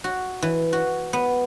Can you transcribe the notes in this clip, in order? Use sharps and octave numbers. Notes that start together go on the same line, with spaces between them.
F#4
E3
F#4
B3